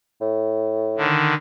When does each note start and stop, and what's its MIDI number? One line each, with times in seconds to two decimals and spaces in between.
0.21 1.13 45
0.98 1.35 50
0.98 1.35 51